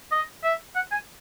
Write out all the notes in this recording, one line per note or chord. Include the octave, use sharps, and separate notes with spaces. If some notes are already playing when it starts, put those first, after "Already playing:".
D#5
E5
F#5
G#5